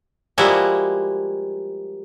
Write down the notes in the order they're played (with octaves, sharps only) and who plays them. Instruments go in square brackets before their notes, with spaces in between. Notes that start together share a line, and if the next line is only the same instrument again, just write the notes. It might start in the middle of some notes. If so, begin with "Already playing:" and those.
[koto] F3 G3 G#3 A#3 E4 F#4